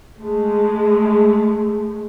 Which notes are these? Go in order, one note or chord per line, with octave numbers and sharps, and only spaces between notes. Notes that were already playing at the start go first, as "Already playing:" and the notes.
G#3 A3